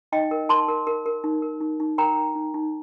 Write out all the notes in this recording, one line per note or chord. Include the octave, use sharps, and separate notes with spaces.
D#4 D#5 G5
A#4
A#4 A5 C6
A#4
A#4
A#4
D#4
A#4
D#4
D#4
A#4 G5 A#5
A#4
D#4
D#4